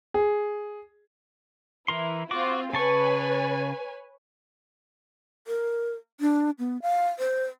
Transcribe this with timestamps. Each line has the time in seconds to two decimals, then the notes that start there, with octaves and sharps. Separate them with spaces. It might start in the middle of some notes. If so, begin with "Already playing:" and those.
0.14 G#4
1.88 E3 E4 A#4 C6
2.31 C4 F4 F#4 D6
2.73 C#3 B4 C#5 G#5 A5 C#6
5.47 A#4
6.20 D4
6.59 B3
6.82 F5
7.19 C5